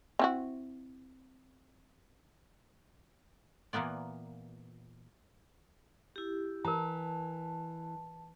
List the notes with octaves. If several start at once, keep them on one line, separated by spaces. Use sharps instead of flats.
C4 E4 F#4
A#2 E3 A#3 B3 D5
E4 G4
E3 A#4 A5 A#5